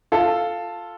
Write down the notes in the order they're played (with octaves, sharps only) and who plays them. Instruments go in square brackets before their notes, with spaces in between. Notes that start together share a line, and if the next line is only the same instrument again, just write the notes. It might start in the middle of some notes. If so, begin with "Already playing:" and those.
[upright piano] F4 A4